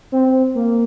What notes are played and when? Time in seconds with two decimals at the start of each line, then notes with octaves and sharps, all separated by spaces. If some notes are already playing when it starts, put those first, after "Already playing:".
0.12 C4
0.55 A#3